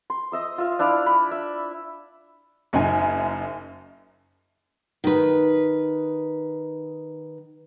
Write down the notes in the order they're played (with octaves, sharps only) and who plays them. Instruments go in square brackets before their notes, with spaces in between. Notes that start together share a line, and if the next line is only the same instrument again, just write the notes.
[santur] C6
D#5 E5 D#6
F4 E5
D4 E4 D5 F5
B5
E5
[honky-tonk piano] F#1 F#2 D#4 G#5
[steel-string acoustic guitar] D#3 B4